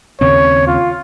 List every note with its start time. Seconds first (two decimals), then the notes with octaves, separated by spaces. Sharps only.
0.21 D#2 C#3 C4 C#5
0.67 F4